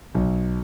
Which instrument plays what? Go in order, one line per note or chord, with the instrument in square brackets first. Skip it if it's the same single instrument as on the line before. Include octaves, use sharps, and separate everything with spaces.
[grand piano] B1